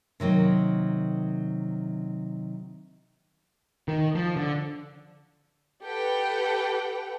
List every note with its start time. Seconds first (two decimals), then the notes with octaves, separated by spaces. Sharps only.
0.20 C3 D#3 F#3 A#3
3.88 D#3
4.15 F3
4.36 D3
5.83 G4 A4 B4 F#5 G5